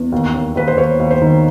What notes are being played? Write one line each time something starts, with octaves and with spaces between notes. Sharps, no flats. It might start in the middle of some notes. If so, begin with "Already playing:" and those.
Already playing: E2
D#2
D#2
D#2 B4
C5
D#2 B4 C#5
D#2
C5
D#3